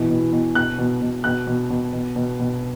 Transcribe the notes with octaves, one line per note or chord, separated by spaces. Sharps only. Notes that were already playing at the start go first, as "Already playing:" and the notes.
Already playing: B2 E3
B2
B2
B2 F#6
B2
B2
B2 F#6
B2
B2
B2
B2
B2